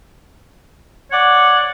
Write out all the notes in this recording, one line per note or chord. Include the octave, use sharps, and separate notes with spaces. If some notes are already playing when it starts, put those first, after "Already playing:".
C#5 D5 F#5